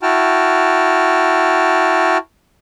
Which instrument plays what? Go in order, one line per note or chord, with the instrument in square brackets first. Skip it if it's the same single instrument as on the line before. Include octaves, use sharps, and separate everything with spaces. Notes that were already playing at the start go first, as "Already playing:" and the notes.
[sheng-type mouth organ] E4 F#4 G5 A5 F6